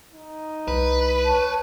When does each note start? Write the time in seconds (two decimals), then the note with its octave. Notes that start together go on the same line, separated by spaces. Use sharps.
0.12 D#4
0.68 C2 B4
1.25 C#5 A5